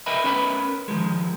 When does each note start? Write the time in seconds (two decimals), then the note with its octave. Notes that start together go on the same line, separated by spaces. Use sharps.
0.06 A#4 B4 D#5 E5 G5 B5
0.24 C#4 A#4 B4 B5
0.88 D#3 F3 G#3